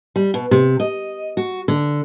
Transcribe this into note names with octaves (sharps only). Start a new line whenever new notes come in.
G3
B2
C3
D#5
F#4
D3